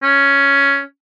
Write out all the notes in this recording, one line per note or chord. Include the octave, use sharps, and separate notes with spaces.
C#4